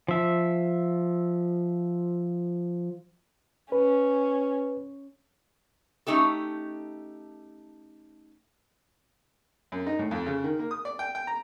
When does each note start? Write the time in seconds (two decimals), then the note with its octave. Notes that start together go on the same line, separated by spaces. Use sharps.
0.08 F3 E5
3.72 C#4 B4
6.07 A3 C#4 D#4 G4 A4
9.72 F#2
9.86 D#4
9.99 A2
10.11 F2
10.26 C#3
10.44 D#3
10.59 A#3
10.71 D#6
10.85 D5
10.99 G5
11.15 G5
11.27 A#5